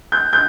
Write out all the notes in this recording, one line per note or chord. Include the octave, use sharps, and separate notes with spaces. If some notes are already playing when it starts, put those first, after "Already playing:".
G6
G6